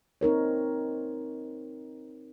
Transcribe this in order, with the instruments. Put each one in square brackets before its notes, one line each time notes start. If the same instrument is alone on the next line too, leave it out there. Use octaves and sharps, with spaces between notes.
[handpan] C4 D#4 A#4 C#5